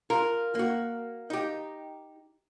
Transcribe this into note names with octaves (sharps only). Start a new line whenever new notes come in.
F4 A#4
A#3 F#4
D#4 G4